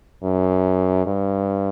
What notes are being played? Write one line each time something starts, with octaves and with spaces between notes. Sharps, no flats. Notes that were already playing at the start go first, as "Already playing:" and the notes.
F#2
G2